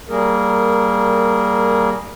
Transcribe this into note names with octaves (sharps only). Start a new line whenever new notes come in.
G3 A#3 G#4 A#4